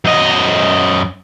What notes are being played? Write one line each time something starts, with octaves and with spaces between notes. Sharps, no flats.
F#2 D#5